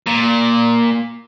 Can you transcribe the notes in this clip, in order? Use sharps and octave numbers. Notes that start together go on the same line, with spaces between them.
A#2